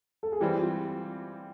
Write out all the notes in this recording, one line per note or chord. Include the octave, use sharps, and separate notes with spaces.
A4
G#4
E3 G3 C4 G4
F4